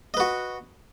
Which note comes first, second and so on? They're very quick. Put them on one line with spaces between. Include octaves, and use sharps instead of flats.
D#5 B4 F#4